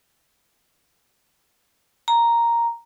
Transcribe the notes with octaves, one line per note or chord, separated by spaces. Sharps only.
A#5